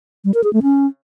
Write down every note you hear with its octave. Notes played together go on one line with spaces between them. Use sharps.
G3
A#4
G#4
A3
C#4